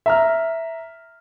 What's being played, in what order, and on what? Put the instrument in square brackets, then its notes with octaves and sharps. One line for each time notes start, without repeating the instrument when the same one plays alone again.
[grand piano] E5 A#5 F6